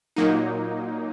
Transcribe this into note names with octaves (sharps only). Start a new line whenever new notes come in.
A#2 F#3 A#3 D#4